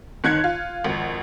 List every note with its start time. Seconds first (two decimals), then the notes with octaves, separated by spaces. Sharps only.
0.24 G1 D#3 F#6 G#6 C#7
0.44 F4
0.84 G#1 F2